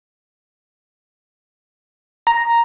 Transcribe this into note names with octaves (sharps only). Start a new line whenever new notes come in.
A#5